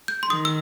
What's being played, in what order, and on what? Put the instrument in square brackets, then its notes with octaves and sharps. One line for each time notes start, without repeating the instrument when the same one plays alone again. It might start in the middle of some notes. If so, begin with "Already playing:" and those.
[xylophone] G6
C6
[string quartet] D#3 [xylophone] D#6
[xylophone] E6